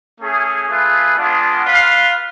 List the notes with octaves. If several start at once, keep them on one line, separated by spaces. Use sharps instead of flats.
A3 C#4 G#4
A3 F4 G#4 B4
G#3 B3 D4 F4
F4 B4 F5